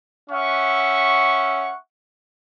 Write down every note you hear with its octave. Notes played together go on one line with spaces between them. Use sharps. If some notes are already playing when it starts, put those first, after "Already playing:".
C#4 E5 F#5 C#6